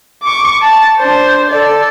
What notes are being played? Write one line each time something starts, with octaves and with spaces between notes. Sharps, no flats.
C#6 D6
A5
D4 C5
A4 D5